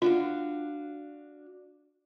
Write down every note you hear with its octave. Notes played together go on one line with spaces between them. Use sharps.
D4 F4 F#4 F5